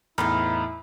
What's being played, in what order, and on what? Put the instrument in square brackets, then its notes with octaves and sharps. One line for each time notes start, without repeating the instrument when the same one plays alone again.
[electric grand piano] E2 A2 [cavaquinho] D#4 B4 F5 [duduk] E4 [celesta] B5 F6